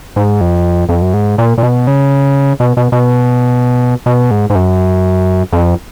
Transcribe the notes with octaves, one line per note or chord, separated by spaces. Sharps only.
G#2
F2
F2
F#2
G#2
A#2
A#2
B2
C#3
B2
B2
B2
B2
G#2
G#2
F#2
F2